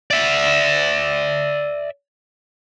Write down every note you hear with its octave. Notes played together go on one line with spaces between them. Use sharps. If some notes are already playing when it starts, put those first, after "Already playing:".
D5 E5